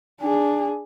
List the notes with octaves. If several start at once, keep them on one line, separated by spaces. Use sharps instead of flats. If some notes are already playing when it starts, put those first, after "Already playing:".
D4 G#4